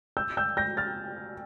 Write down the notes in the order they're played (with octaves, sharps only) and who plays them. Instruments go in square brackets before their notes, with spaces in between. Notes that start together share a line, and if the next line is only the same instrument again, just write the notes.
[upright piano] E6 G6
E6 G6
G6 A#6
F6 A6